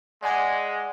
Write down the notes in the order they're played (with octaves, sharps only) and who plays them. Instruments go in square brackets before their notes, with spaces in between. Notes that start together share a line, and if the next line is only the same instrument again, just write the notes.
[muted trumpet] G#3 [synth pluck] D5 F#5 G#5